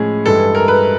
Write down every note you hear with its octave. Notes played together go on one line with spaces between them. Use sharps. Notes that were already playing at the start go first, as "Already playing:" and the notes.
Already playing: A2 F3 G#3 C#4 G#4
G2 E3 G#3 A4
A#4
B4